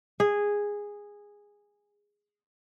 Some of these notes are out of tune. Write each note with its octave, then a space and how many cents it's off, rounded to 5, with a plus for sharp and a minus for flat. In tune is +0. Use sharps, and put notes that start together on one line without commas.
G#4 -10